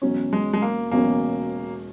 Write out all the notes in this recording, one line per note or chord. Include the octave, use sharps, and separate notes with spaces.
E1 E2 B2 F#3 C#4
G#3
G#3
A#3
E1 E2 B2 F#3 A#3 C#4